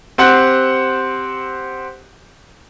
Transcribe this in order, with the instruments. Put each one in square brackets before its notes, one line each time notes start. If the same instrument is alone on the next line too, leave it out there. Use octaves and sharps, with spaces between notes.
[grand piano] C4 G4 C5 F#5 F#6